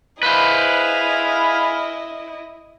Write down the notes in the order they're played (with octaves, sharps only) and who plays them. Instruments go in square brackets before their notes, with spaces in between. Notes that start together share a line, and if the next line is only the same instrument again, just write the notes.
[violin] E4 D#5 [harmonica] G#4 F5 B5 [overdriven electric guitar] B4 C5